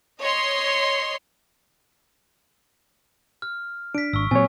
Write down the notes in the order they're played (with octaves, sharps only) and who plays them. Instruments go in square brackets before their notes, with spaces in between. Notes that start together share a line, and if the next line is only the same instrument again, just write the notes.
[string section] C#5 D#5 C6
[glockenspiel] F6
[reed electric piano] D4 [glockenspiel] B6 D7
[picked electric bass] G#1 [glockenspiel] C#6 E6
[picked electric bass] A#2 F3 F#3 [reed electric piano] C4 C#5 [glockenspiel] G#5